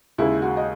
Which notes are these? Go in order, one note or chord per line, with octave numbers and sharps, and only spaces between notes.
D#2 C#3 G#3 E4
F#4
D#5